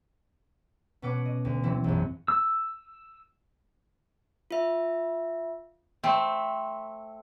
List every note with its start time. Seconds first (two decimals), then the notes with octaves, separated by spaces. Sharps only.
1.02 B2 C#4 B4 F#5 D6
1.25 D#5
1.45 D2
1.63 E3 F#3 C4 E4
1.84 A#1 F#2
2.28 E6
4.51 F4 E5
6.03 A3 C4